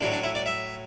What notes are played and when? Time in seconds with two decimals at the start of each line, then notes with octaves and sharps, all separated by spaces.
0.01 A2 F#3 D4
0.12 D4
0.23 E4
0.35 D5
0.46 E5